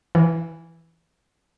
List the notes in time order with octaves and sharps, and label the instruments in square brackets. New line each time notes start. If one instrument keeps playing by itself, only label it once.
[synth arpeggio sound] E3